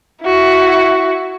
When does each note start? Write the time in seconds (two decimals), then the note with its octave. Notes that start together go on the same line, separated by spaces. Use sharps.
0.23 E4 F#4